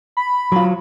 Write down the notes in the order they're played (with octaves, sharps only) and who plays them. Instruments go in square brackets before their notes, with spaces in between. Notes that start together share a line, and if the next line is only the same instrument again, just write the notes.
[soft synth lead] B5
[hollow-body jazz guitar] F#3 F4